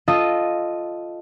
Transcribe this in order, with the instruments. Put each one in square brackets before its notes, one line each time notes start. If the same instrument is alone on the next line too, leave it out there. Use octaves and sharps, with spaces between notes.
[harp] F4 A4 D#5